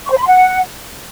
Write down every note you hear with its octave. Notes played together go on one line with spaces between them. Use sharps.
C#6
C5
B5
C6
F#5